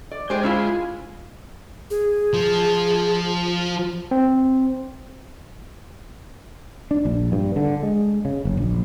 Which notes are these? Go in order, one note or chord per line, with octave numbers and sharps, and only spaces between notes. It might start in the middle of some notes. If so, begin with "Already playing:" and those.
D5
G#3 G4 C5
C#4 E4 F4
G#4
F3
C4
D4
A#1
G2
D3
G#3
C#3
F#1
A#1